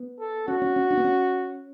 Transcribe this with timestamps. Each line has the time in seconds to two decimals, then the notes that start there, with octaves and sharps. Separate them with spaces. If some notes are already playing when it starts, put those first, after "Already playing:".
Already playing: B3
0.20 A4
0.48 C#4 F#4
0.62 C#4
0.76 C#4
0.91 D4
0.97 B3
1.04 C#4